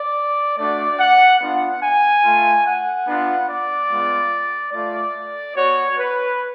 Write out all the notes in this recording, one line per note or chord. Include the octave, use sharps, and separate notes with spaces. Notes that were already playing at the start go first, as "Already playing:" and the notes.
Already playing: D5
A3 D4 F#4 D5
F#5
B3 D4 F4 F#5
G#5
A3 F4
F#5
B3 D4 F4
D5
G#3 B3 F4
A3 F4 D5
B3 F#4 C#5
B4